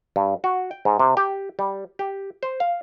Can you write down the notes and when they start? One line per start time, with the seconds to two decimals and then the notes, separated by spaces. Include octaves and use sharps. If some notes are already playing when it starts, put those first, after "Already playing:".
0.16 G2
0.44 F#4
0.71 G5
0.85 G#2
0.99 C3
1.17 G4
1.59 G3
1.99 G4
2.43 C5
2.60 F5